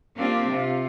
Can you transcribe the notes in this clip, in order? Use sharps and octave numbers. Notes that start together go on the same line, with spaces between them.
A#3 C4 D4 F4 G4
C3 F4